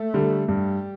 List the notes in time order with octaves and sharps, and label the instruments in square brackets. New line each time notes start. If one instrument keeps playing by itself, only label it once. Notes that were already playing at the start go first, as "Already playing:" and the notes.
Already playing: [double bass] A3
[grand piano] D3 G3
[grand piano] G2 [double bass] G3